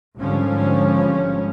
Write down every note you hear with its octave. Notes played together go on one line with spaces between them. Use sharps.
G#1 G#2 D3 F3 G3 C#4